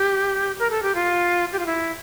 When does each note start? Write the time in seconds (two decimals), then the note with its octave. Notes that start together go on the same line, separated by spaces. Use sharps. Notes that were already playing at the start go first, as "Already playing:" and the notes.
Already playing: G4
0.59 A#4
0.70 A4
0.83 G4
0.95 F4
1.52 G4
1.59 F4
1.66 E4